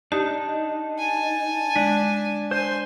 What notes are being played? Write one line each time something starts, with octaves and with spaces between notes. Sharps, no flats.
D4 D#4 G4 D#6
G#5 A5
G#3 D4
C5 G#5 C6